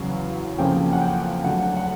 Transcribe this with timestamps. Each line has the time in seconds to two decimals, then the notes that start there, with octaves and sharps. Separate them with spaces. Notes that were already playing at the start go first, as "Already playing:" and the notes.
Already playing: E2 C#3 F#3 F5
0.58 F2 C#3 F3 A#3 C#4 G5
0.93 F#5
1.02 G5
1.44 D2 D3 F#3 F#5
1.77 F#5